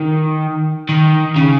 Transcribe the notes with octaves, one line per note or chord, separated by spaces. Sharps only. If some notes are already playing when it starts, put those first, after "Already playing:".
Already playing: D#3
D#3
C#3